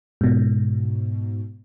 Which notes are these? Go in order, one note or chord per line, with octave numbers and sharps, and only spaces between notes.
G#2 B2